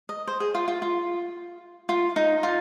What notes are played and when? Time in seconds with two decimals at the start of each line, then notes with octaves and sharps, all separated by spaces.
0.09 D#5
0.27 C5
0.40 G#4
0.55 F4
0.68 F4
0.82 F4
1.89 F4
2.16 D#4
2.43 F4